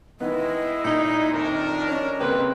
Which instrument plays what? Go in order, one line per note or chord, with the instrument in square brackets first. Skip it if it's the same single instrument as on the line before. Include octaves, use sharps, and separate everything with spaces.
[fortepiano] D#3 B3 [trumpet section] G#3 E4 [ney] D#5
[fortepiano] A#2 [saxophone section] D#4
[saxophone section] F2 A2 D#3 [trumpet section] D4 A#4
[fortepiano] C#4 [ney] D#5
[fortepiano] C#3 A#3 C4 [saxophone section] G4 B4